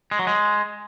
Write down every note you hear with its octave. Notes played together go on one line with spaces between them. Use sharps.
G#3
F#3
G#3